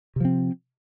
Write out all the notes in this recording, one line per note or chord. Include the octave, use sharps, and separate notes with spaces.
C3 F3 C4